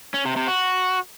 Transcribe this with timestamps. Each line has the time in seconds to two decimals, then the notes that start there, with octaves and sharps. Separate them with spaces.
0.14 C#4
0.25 C3
0.36 C3
0.48 F#4